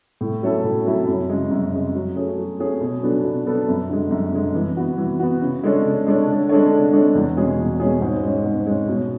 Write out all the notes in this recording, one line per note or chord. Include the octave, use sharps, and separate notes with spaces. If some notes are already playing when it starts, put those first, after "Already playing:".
A2
F#3 C#4 E4 A4
A2
F#3 C#4 E4 A4
F#2
C#3 G#3
F#2
C#3 G#3
F#3
A3 C#4 G#4
F#3
A3 C#4 G#4
B2
F#3 B3 D4 A4
B2
F#3 B3 D4 A4
F#2
D3 G#3
F#2
D3 G#3
E3
B3 F#4
E3
B3 F#4
C#3
G#3 D4 A4 C#5
C#3
G#3 D4 A4 C#5
D3
G#3 D4 A4 C#5
D3
G#3 D4 A4 C#5
E2
B2 G#3 C#4 G#4
E2
B2 G#3 C#4 G#4
G#2
G#3 C#4
G#2
G#3 C#4
B2